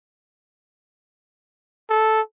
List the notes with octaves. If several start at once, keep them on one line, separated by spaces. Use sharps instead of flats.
A4